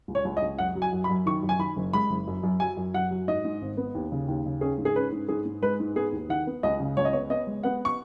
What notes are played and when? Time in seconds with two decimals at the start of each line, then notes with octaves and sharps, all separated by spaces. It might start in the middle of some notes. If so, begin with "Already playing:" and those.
0.08 C#2
0.15 C#5
0.25 C#2
0.37 D#5
0.42 C#2
0.58 F#2 F#5
0.75 F#3
0.82 G#5
0.93 F#2
1.04 B5
1.09 F#2
1.26 D#3 C#6
1.43 F#2
1.49 G#5
1.59 D#3 B5
1.77 F#1
1.93 G#3 B5
2.10 F#1
2.27 F#2
2.43 F#2
2.60 F#3 G#5
2.77 F#2
2.94 F#2 F#5
3.11 F#3
3.28 G#2 D#5
3.45 G#2
3.62 G#1
3.77 B3
3.95 D#2
4.12 C#3
4.28 D#2
4.46 C#3
4.61 C#4 G#4
4.78 G#2
4.85 G#4
4.96 C#4 B4
5.12 G#2
5.28 G#2 G#4
5.46 G#2
5.62 G#3 B4
5.80 G#2
5.96 B3 G#4
6.12 D#2
6.29 D#3 F#5
6.47 B3
6.63 C#2 D#5
6.80 C#3
6.97 C#2 C#5
7.05 D#5
7.13 B3 C#5
7.30 B3 D#5
7.47 G#3
7.63 B3 F#5
7.85 C#6